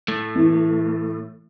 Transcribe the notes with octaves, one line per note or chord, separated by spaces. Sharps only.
A2 A3
E3